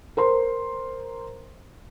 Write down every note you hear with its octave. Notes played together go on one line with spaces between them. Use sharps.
A#4 C5 C6